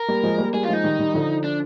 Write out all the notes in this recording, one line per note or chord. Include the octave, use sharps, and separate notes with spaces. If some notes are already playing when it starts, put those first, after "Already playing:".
Already playing: A#4
G3 A#3
F3 G#3
G3 A#3
G3 A#3 G#4
F4
F3 G#3 D#4
D#3 G3
D#3 G3
D3 F3
D4